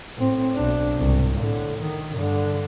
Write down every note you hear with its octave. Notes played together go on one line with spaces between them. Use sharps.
A2 C4
B1 D4
C2 G#2
A2 D3
D#3
G2 D3